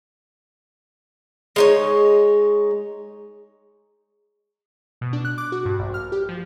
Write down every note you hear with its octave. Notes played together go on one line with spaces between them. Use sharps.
G#3 D#4 C#5
B2
D4
F#6
D6
F#4
G2
A#1
F6
G4
F3